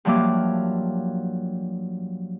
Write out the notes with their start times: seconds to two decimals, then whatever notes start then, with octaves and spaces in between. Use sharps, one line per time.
0.05 G2 F3 F#3 A#3 E5 D6